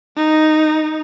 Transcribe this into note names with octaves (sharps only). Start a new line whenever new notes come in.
D#4